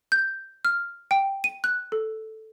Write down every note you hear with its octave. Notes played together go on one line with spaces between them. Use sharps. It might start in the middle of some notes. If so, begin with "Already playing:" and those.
G6
F6
G5
D#7
F#6
A4